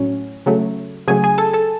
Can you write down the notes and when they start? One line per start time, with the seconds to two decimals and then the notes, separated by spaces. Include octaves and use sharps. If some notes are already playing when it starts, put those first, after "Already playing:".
Already playing: A2 F#3 C#4
0.46 C#3 F#3 A3
1.08 C#3 F#3 A3 G#4 G#5
1.24 G#4 G#5
1.38 A4 A5
1.53 A4 A5